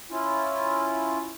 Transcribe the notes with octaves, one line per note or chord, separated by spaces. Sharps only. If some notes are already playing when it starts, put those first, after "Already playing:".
C#4 E4 F4